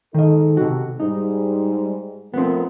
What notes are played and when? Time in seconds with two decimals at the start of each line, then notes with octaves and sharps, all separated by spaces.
0.14 G#2 D#3 D#4 A4 D#5
0.57 C3 F#4
1.00 G#2 G3 D#4
2.34 F3 A3 B3 C4 A#4